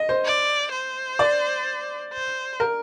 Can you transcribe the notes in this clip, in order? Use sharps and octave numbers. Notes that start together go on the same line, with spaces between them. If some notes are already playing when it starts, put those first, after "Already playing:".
Already playing: D#5
C5
D5
C5
D5
C5
A#4